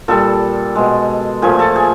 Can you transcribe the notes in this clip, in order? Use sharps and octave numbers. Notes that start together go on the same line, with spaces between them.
A#2 G3 A4 A5
B2 G#3
A#2 F3 A3 G#4 G#5
A4 A5
G#4 G#5